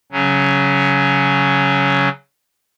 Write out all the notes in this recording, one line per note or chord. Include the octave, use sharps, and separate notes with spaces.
C#3 F#3 C#4